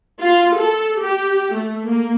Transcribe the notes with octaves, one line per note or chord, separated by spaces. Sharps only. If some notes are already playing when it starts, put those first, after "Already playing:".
F4
A4
G4
A3
A#3